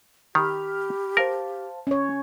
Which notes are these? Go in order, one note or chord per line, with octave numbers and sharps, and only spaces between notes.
D#3 G4 B5 F6
A#4 C5 F5 A5
C#4 C#5